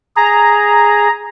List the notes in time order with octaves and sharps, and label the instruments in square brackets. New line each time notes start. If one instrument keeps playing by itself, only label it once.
[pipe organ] G#4 [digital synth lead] A#5